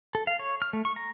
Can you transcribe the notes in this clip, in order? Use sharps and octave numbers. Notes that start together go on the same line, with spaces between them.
A4
F5
C#5
F6
A3
C#6
A#5